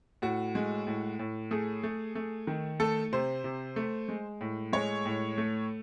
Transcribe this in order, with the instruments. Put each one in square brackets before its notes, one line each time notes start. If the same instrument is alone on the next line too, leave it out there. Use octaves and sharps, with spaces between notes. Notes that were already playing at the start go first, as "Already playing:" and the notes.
[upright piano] A2 F#4
G#3
A2
A2
A3 G#4
A3
A3
D#3
A3 A4
C3 C5
C3
A3
G#3
A2
G#3 C#5
A2
A3